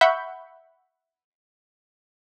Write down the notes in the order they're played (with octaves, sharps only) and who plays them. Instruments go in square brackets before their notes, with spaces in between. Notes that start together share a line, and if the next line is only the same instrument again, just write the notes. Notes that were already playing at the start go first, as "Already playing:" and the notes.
[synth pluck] E5 F#5 B5 C#6 G6